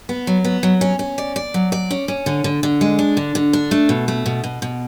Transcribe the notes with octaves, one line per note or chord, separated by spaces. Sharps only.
B3
F#3
B3
F#3
C#4
C#4
D5
D5
F#3
D5
C#4
C#4
D3
D3
D3
G#3
D4
D3
D3
D4
A3
B2
A3
B2
B2
B2